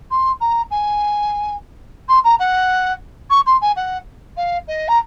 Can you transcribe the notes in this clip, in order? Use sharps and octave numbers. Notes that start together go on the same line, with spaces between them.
C6
A#5
G#5
C6
A#5
F#5
C#6
C6
G#5
F#5
F5
D#5
A#5